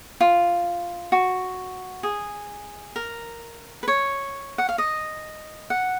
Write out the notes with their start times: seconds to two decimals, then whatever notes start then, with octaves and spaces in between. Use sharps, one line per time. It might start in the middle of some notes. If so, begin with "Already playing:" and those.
0.21 F4
1.12 F#4
2.03 G#4
2.96 A#4
3.83 B4
3.88 C#5
4.58 F#5
4.69 F5
4.78 D#5
5.70 F#5